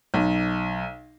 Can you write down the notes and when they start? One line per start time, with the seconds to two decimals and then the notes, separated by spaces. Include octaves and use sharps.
0.14 B1